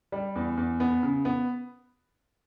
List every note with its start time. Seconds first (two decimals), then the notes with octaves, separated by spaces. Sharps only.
0.12 G3
0.36 E2
0.57 E2
0.80 B3
1.03 C#3
1.25 B3